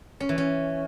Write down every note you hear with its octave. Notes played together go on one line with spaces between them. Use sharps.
C#4
E3
C#4